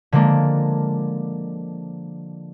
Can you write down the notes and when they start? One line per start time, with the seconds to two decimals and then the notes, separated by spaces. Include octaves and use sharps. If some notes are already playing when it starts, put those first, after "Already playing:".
0.12 D3 F3 G#3 A#3 D4